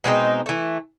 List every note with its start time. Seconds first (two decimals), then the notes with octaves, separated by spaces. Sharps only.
0.04 B2 G#3 C4 D#4
0.46 E3 A3